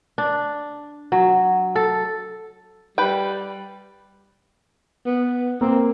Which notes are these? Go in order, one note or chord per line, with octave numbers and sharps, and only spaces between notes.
D4
F#3
A4
G3 B4 G5
B3
A#3 C4